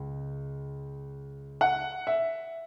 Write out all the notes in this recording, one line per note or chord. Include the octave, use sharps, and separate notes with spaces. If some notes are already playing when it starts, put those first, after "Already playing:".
Already playing: C#2
F#5
E5